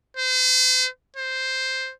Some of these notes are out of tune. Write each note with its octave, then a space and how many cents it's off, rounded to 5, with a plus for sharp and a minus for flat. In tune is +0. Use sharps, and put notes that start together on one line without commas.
C5 -40
C5 +0